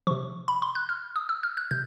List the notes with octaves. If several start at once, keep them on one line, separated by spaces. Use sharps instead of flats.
C3 F3 C#6
B5
C6
F#6
F6
D#6
E6
F6
F#6
C3 G6